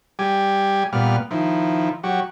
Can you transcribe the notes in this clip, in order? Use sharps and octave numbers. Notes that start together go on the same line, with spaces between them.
G3 G4 G#5
A#2 G3 B3 F6
D#3 F3 E4
F#3 F#4 G4